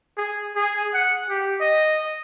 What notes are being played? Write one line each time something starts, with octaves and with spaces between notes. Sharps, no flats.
G#4
G#4
F#5
G4
D#5